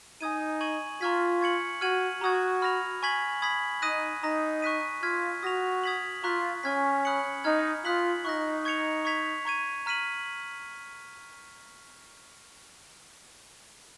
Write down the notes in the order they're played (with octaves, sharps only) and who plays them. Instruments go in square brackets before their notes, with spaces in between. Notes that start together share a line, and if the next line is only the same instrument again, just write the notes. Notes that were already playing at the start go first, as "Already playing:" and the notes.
[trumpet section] D#4 [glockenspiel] G#5 D#6 G#6 D#7
[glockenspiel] C#6 G#6 D#7 F#7
[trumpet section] F4 [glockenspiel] A#5 C#6 F6 G#6 B6
[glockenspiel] C#6 G#6 C#7 F#7
[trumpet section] F#4 [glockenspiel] F6 G#6 D#7 F#7
[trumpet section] F#4 [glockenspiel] A#5 D#6 G#6
[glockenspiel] B5 F6 A#6 F7
G#5 C#6 G#6 B6 F#7
B5 D#6 G#6 B6 F#7
[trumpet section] D#4 [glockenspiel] D#6 F#6 A#6 D#7
[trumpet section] D#4 [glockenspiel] A#5 D#6 A#6
[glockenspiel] C#6 F#6 B6 D#7
[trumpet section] F4 [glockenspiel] F6 G#6 B6
[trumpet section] F#4 [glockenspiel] D#6 A#6 F7
[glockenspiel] D#6 G#6 B6 F#7
[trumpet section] F4 [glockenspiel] A#5 C#6 F#6 B6
[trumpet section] C#4 [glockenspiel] G#5 C#6 F6 G#6 B6
[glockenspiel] B5 D#6 F#6 C#7 F#7
[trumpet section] D#4 [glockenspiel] A#5 F6 G#6
[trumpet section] F4 [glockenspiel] D#6 F#6 B6 F#7
[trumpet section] D#4 [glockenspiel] C#6 F#6 A#6
[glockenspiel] C#6 G#6 C#7 F7
C#6 G#6 B6 F7
A#5 C#6 G#6 D#7
A#5 F6 B6 D#7 F#7